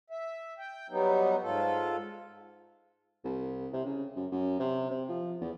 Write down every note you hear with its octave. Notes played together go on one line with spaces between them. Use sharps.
E5
G5
F#3 G3 B3 D#4
G#2 F4 A4
C2
C3
C#3
F#2
F#2
C3
C3
F3
E2